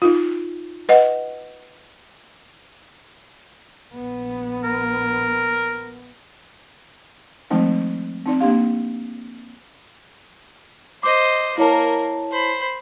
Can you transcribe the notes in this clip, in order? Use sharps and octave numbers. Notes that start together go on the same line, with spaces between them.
D#4 F4
B4 D#5 F#5
A#1 B3
A#4
D#3 F3 G#3 A3 C4 D#4
C4 D#4 D5
A#3 D4 G4 F5
C5 D#5 D6
A#3 E4 A#4 C#5 A5
C5 B5